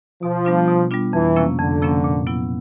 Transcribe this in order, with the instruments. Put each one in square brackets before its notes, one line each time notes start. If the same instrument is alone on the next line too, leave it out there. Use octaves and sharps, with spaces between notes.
[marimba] B2 [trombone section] F3
[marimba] G3 B3 D4 F4
B2
G3 B3 D4 F4
[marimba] F2 [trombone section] E3
[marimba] C3 F3 A#3 C#4
[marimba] F2 [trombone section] D3
[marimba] C3 F3 A#3 C#4
A#2
F#3 B3 E4